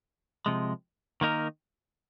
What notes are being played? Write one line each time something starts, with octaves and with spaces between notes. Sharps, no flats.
C3 F3 G#3
D#3 A#3 D#4 A#4